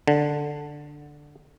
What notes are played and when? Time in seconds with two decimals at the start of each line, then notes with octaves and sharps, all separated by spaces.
0.08 D3